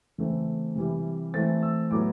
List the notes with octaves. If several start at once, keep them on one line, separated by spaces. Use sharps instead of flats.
C#3 E3 A3 C4
C3 E3 G3
E3 A3 C4 A6
E6
A2 F#3 B3 D6